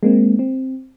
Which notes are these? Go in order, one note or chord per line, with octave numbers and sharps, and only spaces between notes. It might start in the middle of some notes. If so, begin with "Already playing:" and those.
G#3 A#3 C4
C4